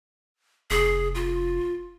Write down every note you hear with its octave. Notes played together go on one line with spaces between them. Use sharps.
F1 G#4
F4